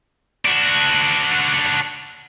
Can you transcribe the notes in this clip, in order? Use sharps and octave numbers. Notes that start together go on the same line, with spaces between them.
D4 F#4